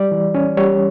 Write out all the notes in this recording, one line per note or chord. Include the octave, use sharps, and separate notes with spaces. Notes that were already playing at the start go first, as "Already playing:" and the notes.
Already playing: G3 D5
E3
C#4
G3 C#5